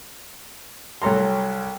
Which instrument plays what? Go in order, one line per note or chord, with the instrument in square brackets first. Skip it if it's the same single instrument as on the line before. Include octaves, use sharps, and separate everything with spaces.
[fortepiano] C2 F#3 A4 A#5 C6